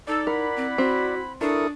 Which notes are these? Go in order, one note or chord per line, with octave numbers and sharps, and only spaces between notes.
D#4 A4 D5
E4 A#4 F#5 B5
C4
C4 F#4
D4 E4 A4 A#4 D5 C#6 D#6